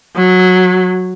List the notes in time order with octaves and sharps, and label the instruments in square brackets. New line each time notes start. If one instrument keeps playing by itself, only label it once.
[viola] F#3